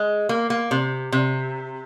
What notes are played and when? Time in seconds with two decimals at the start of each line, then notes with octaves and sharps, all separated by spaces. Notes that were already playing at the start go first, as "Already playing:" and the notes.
Already playing: G#3
0.29 A#3
0.50 A#3
0.71 C3
1.12 C3